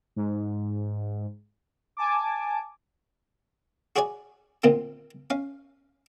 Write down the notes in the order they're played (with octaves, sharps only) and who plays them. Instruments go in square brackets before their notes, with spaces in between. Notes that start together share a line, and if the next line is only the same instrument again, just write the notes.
[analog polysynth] G#2
G#5 A5 D6
[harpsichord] F#4 G#4 C#5 D5 G#5
D2 A#2 D#3 A#3 C4
C#4 F5